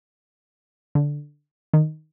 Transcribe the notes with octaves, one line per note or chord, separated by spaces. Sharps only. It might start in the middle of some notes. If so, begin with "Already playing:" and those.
D3
D#3